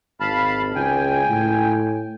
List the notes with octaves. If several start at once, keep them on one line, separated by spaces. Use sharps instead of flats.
G#1 F5 A5 B5
C#2 G5 G#5
A2